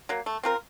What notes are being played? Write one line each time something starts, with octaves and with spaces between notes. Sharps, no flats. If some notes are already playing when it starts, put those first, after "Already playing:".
F#3 A#3
A3
C4 F4 A#4